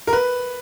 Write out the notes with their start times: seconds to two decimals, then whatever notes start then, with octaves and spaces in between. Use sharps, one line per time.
0.07 A#4
0.13 B4